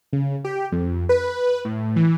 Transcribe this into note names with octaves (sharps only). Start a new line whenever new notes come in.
C#3
G4
F2
B4
A2
E3